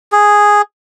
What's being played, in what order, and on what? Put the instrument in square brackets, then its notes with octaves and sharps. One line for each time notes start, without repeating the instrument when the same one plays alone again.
[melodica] G#4